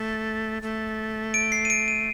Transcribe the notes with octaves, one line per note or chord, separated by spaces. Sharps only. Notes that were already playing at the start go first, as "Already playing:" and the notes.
Already playing: A3 A6
A3
D7
C7
D#7
D7
D#7